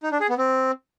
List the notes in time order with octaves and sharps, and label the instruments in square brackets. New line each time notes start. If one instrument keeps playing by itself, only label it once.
[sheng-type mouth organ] D#4
D4
G#4
B3
C4